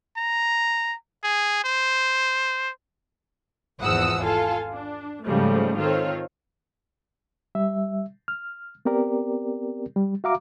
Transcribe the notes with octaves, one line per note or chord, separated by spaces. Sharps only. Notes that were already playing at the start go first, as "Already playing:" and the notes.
A#5
G#4
C5
G#1 E2 F3 F#5 D#6 E6
F4 A4 F5 G#5
D4
G#2 C#3 F3 G3 A3
D#3 C4 F4 A4 C#5
G3 E5
F6
B3 C4 G4 A#4 D5
G3
F#4 E5 F5 A#5 D6